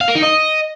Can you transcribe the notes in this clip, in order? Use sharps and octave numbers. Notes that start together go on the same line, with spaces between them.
F5
A#4
D#4
D#5